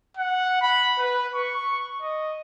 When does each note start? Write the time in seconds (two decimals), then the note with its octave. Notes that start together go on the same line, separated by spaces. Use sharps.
0.17 F#5
0.62 B5
0.99 B4
1.35 C#6
2.02 D#5